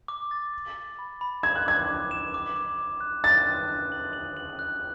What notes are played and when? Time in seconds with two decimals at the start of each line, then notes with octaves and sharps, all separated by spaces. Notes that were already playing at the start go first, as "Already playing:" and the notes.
0.08 D6
0.31 A6
0.54 D6
0.77 A6
0.99 B5
1.21 B5
1.43 G#6 E7
1.55 F#6
1.66 D6 G#6
1.88 D6
2.11 E7
2.34 D6
2.56 D6
2.79 D6
3.01 F#6
3.24 D6 A6
3.46 F#6
3.68 F#6
3.92 F#7
4.13 F#7
4.37 F#7
4.59 F#6